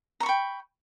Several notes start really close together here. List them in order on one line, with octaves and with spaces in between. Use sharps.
A#5 C#6 B5 G5